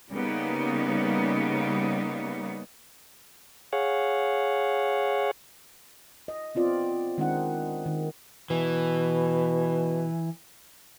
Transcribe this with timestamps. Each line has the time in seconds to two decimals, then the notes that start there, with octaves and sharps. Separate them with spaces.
0.10 C#3 G3 A#3 B3 D#4
3.73 G#4 C#5 F5 F#5
6.28 D#5
6.55 B3 C4 F4 D5
7.18 D#3 G#3 C4 D4 D#4 F#5
7.86 D#3
8.50 B2 E3